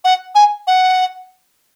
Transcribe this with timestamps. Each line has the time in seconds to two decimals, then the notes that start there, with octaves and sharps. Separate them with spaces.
0.05 F#5
0.35 G#5
0.67 F#5